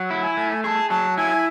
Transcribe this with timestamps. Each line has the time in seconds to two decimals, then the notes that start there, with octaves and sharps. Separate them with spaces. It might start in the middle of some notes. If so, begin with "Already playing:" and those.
Already playing: F#3 F#5
0.10 E4
0.23 G#5
0.37 A3
0.63 G#4 A5 C#6
0.90 F#3 A5
1.17 E4 G#5